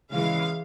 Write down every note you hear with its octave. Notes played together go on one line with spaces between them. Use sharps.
C#3 E3 G#3 F5